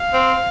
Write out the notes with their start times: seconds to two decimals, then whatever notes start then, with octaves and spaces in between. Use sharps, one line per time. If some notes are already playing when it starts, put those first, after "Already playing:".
Already playing: F5
0.13 C4